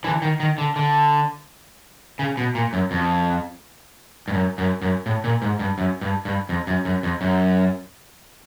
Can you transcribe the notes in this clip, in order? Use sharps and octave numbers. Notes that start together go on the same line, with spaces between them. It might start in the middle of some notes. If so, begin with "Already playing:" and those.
D3 E3
D#3
D#3
D3
D3
C#3
B2
A#2
F#2
F2
G2
F#2
F#2
F#2
A2
A#2
G#2
G2
F#2
G2
G2
F2
F#2
F#2
F2
F#2